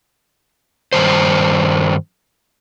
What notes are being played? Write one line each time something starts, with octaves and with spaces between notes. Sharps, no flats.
G2 D#3 C5